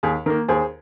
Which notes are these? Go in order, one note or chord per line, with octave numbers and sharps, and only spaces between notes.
D#2 G#4
D#3 A#3 A#4
D#2 G#4 C5